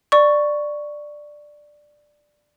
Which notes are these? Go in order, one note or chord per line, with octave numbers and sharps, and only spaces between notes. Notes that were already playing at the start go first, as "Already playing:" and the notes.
D5 C#6